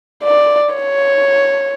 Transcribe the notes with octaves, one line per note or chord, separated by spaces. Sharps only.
D5
C#5